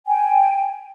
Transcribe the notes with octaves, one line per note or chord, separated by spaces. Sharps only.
G5 G#5